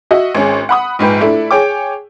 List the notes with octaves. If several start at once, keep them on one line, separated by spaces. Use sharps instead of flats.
F#4 D#5 E5
G#1 C#4 G#4
F#5 B5 D#6
A#1 G#2 B4 G5
A3 D4 E4
G#4 C#5 G5 D6